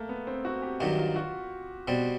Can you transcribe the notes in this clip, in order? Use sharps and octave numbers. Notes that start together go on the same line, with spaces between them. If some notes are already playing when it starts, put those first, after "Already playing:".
Already playing: A3 A#3
B3
C4
F#4
G4
G2 D#3 F#3 G4
F4
F#4
B2 G3 C4